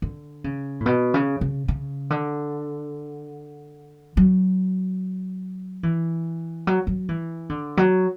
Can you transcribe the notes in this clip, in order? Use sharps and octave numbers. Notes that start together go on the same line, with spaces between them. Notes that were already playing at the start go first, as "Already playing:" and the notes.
D3
C#3
A2
B2
C#3
C#3
C#3
D3
F#3
E3
F#3
F#3
E3
D3
F#3